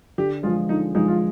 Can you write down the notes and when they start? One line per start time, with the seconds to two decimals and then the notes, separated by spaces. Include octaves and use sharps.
0.18 D3 G4
0.43 F3 G#3 F4
0.69 D3 D#4
0.95 F3 G#3 D#4
1.08 F4